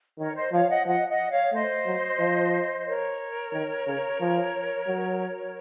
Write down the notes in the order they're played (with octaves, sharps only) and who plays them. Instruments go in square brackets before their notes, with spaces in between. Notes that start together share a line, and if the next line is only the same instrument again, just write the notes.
[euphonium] D#3 [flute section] A#4 C#5
[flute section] C5 D#5
[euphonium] F3 [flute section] C#5 F5
[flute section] D#5 F#5
[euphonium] F3 [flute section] D#5 F#5
[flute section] D#5 F#5
C#5 F5
[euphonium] A3 [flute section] C5 D#5
[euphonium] F#3
F3
[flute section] A#4 C#5
[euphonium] D#3
C#3
F3
F#3